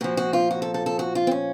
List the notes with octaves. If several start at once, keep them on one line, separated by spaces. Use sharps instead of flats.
A#2 F3 F#4
F#4
F4
F#4
A4
A4
A4
F#4
F4
C4
C#4